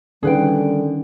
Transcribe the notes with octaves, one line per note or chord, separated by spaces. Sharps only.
D3 D#3 G3 C#4 G#4 B4 G5